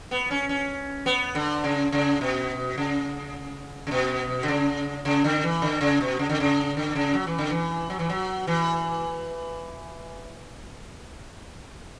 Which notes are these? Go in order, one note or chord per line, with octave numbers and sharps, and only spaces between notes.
B3
C#4
C#4
B3
D3
C#3
C#3
B2
C#3
C#3
B2
D3
C#3
C#3
D3
E3
D3
C#3
B2
C#3
D3
C#3
D3
C#3
F#3
E3
D3
E3
F#3
E3
F#3
E3